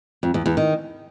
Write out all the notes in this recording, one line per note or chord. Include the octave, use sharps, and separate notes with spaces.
F2
E2
E2
D#3